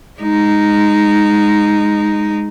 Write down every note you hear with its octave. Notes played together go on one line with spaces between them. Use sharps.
G#3 D#4